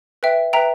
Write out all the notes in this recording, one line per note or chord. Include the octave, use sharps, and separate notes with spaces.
B4 E5 G5
B4 E5 G5 A#5